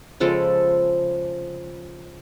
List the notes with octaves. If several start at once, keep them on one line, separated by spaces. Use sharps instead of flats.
C#3 F3 G#3 A4